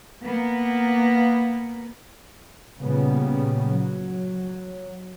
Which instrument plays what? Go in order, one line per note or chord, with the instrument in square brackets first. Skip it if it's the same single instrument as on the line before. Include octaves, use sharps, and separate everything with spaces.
[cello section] A#3 B3
[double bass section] A#2 C#3 G3 B3
F#3